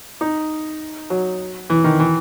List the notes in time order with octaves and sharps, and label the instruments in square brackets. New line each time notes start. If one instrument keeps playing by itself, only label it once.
[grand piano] D#4
F#3
E3
D#3
E3